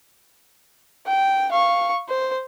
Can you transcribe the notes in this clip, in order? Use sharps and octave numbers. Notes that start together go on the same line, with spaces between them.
G5
F5 C#6
C5